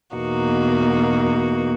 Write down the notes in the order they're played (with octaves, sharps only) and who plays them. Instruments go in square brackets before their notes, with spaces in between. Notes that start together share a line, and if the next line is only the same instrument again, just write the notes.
[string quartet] E2 B2 A#3 D#4 F#4